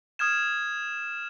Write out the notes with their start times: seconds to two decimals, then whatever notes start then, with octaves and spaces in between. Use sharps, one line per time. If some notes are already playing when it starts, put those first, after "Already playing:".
0.19 D#6 F6 G#6 E7